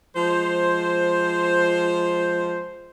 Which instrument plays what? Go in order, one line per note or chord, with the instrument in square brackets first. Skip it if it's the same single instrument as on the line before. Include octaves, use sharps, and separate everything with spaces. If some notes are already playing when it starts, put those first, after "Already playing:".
[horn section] F3 G#3 C5